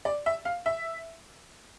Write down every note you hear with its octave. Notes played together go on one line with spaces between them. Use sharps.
D5
E5
F5
E5